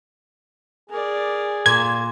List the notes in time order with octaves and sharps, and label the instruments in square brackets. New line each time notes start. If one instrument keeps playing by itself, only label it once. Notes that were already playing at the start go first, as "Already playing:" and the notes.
[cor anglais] G#4 [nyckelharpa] A#4 D5
[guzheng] A#2 [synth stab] G#6